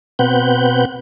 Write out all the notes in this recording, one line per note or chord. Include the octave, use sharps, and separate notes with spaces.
B2 C4 B4 F#5 G6